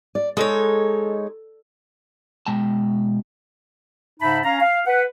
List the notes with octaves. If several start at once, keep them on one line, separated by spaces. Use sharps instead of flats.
D5
G#3 D#4 A4 C#5
B2 G#3 G5 A5
G#2 C#3 D#4 E5 A5 B5
C#4 F5 A#5
F5
B4 F#5